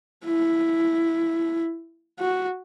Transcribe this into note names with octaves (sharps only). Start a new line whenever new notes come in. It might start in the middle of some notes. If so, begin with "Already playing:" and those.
E4
F#4